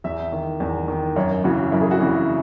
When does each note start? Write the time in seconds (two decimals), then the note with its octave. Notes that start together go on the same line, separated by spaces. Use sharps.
0.04 E2 E5
0.32 D#3
0.60 E2
0.88 D#3
1.16 F#2 C#5
1.44 C#3 E3 F#4
1.72 F#2 E4
1.81 G#4
1.91 F#4
2.00 C#3 E3
2.10 E4